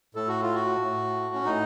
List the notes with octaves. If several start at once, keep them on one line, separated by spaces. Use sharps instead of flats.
A2 A4
F#4
F4
F#4
A2
C#4
A2 D#4